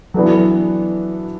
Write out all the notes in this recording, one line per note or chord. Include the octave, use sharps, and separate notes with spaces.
E3 F#3 B3 D4 F#4 A4